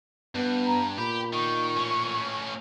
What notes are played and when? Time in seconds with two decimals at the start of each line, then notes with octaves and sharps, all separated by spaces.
0.35 G2 B3
0.67 A#5
0.98 A#2 G4 B5
1.33 D#3 C#6
1.76 A2 C#4